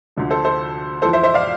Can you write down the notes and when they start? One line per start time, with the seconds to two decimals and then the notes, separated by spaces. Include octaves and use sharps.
0.16 D2 D3 F3
0.30 A4 C5
0.45 A4 C5
1.02 F2 E3 A4 C5
1.13 C5 E5
1.23 C5 E5
1.34 D5 F5